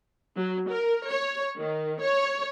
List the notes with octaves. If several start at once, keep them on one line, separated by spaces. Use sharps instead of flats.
F#3
A#4
C#5
D#3
C#5